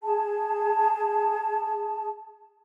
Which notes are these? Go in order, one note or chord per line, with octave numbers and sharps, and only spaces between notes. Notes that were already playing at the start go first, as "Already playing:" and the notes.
G#4 A5